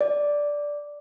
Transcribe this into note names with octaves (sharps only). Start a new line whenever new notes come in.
D5